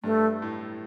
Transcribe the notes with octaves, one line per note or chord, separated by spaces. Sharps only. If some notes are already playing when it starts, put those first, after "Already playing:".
G2 A3
A2